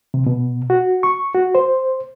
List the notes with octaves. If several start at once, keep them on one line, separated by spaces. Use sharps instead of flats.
C3
B2
F#4
C#6
F#4
C5